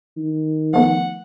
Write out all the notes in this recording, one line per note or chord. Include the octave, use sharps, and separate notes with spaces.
D#3
F3 A3 B3 F#5